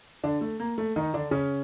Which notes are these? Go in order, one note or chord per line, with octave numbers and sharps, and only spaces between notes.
D3 D4
A3
A#3
A3
D#3 D#4
D3 D4
C#3 C#4